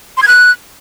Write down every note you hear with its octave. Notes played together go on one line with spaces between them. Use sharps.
C6
G#6
F#6